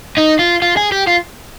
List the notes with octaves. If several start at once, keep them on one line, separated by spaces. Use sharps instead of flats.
D#4
F4
F4
G#4
G4
F4